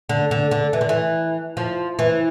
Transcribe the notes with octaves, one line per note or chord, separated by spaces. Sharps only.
D3
D3
D3
E3
D3
E3
F3
E3